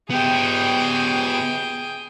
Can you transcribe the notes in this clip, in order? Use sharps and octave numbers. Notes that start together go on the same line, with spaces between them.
B3 G4 G#4 G5